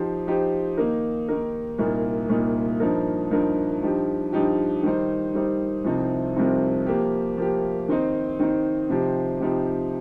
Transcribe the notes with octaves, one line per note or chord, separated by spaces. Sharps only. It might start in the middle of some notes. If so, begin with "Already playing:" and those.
Already playing: F3 D#4 G4 C5
F3 D#4 G4 C5
D#3 A#3 D#4 A#4
D#3 A#3 D#4 A#4
C2 A#2 A#3 D#4
C2 A#2 A#3 D#4
G2 F3 D#4 A#4
G2 F3 D#4 A#4
G2 F3 D#4 G4
G2 F3 D#4 G4
D#3 G3 D#4 C5
D#3 G3 D#4 C5
C2 C3 F3 C4 D#4
C2 C3 F3 C4 D#4
F3 A#3 G4
F3 A#3 G4
D#3 C4 D#4 C5
D#3 C4 D#4 C5
C3 F3 D#4 G4 C5
C3 F3 D#4 G4 C5